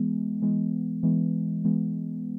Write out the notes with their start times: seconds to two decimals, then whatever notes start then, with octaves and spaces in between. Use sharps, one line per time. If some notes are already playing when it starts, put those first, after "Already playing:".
Already playing: E3 G#3 B3
0.42 E3 G#3 B3
1.03 E3 G#3 B3
1.65 E3 G#3 B3